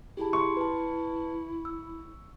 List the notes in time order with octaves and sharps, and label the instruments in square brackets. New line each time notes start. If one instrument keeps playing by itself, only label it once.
[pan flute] E4 [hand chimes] G4 G#4 A5
[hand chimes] C6 [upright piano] C#6
[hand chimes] B4 A5
E6